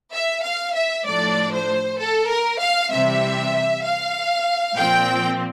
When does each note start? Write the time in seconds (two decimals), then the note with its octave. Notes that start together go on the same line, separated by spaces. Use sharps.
0.13 E5
0.43 F5
0.75 E5
1.05 A2 F3 A3 D4 D5
1.52 C5
1.99 A4
2.30 A#4
2.60 F5
2.91 C3 E3 G3 C4 E5
3.84 F5
4.76 A#2 F3 C4 G5